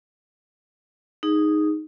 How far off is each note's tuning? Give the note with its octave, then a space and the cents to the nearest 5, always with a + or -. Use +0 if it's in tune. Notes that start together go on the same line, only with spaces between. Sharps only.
D#4 -5 G#4 -5